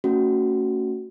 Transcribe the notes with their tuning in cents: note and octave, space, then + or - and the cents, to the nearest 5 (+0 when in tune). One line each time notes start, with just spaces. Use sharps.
A3 +45 C#4 +10 F#4 +0